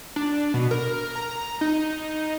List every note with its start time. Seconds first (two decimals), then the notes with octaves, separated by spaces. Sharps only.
0.16 D4
0.54 B2
0.71 A#4
1.15 A#5
1.61 D#4